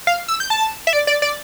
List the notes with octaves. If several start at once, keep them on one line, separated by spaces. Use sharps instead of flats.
F5
E6
G6
A5
E5
D5
D5
D5